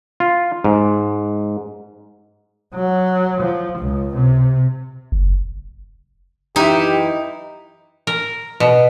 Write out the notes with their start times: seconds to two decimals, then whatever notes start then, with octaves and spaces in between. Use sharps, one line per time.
0.20 F4
0.64 G#2
2.74 F#3
3.41 F3
3.79 C#2
4.15 C3
5.12 F#1
6.56 F#2 E3 D#4 E4 G4
8.07 A#4
8.60 B2